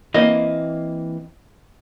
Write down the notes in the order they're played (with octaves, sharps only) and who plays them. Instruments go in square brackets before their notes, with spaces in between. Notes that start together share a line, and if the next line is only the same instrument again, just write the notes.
[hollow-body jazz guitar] E3 A#3 C4 [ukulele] D#5